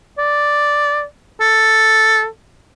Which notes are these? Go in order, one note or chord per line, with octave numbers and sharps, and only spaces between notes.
D5
A4